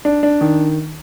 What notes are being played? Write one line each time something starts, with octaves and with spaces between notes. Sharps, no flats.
D4
D4
D#3